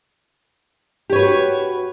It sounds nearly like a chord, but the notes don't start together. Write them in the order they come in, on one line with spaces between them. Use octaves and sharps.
G4 C#5 B4 F#4